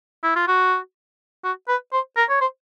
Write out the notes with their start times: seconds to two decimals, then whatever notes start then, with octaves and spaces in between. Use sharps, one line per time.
0.23 E4
0.36 F4
0.48 F#4
1.44 F#4
1.69 B4
1.93 C5
2.17 A#4
2.29 C#5
2.41 C5